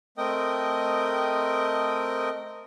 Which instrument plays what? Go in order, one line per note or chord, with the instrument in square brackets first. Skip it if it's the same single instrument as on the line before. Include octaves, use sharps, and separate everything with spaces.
[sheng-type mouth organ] A3 C4 A#4 D#5 G5 D#6